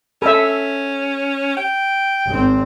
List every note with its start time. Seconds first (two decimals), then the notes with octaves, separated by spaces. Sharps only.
0.22 C#4 A4 E5
1.57 G5
2.27 G#1 C4